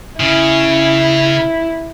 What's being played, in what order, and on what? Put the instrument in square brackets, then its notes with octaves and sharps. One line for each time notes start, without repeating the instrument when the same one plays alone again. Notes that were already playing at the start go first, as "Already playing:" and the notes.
[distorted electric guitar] C#3 [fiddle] E4